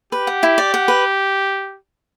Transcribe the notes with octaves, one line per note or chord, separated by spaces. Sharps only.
G4 B4
F#5
E4
D5
F#5
B4